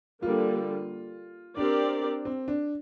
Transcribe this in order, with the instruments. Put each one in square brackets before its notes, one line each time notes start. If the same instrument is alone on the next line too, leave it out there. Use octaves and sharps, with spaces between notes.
[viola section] D3 G3 A#3 [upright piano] F4
[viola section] C4 G4 A#4 D5 [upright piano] D4
[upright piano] C4
D4